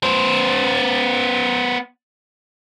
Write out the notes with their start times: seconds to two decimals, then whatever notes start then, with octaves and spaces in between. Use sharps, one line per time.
0.03 B3 C5